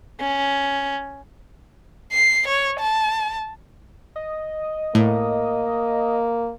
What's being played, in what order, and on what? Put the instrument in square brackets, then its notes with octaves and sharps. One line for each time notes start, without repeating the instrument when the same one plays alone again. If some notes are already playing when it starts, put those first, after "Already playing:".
[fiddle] C#4
[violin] C7
C#5
A5
[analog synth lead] D#5
[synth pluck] A2 [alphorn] A#3